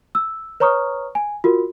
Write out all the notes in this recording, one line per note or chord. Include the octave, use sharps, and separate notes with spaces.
E6
B4 C#5 A#5 C#6 D#6 F6
G#5
F4 F#4 A#4